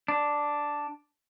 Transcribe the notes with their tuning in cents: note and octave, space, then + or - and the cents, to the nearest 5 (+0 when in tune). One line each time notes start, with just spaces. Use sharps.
D4 +0